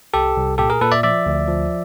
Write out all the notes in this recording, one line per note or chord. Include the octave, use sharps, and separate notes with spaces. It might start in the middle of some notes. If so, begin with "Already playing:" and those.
C2 G4 A4
C2
A#2 G4 A4
G#4 A#4
A#2 A4 B4
D5 E5
F3 D5 E5
D2
F3